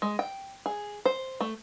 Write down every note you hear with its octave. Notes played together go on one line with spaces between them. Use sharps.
G#3
G5
G#4
C5
A3